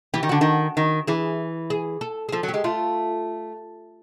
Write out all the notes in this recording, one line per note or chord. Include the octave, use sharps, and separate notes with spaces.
E3 G4
D#3
D3 F#4
D#3
D#3
E3 G#4
G#4
A4
G#4
F3 A4
F#3
G4
G#3
A3 F4